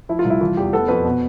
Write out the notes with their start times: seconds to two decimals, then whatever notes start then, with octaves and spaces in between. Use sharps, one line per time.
0.09 F3 E4
0.19 F4
0.25 C2
0.30 E4
0.41 E3 F4
0.57 E2 G4
0.73 B3 A4
0.88 F2 B4
1.05 B2